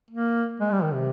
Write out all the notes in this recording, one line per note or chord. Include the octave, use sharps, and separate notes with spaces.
A#3
G#3
G3
D#3
C3